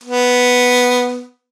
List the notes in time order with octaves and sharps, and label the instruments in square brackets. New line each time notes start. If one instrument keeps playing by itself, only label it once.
[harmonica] B3